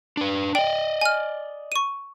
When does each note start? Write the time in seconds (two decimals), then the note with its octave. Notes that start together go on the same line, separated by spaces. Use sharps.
0.17 D4 B4
0.55 D5 D#5 G5
1.01 G#5 F6
1.72 C#6 D#7